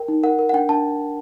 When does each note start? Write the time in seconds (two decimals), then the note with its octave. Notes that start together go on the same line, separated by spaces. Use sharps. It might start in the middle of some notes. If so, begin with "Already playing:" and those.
Already playing: A#4 G5
0.08 D#4
0.23 A#4 F#5
0.39 A#4
0.49 F#5
0.53 D4 G5
0.69 D4 A5